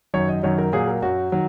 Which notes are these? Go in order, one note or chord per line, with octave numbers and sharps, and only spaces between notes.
F#2 D#3 F#3 C#5
D#5
F#2 D#3 F#3 C#5
A#4
A#2 F#3 G#4
A#4
F#2 F#3 F#4
D#3 F#3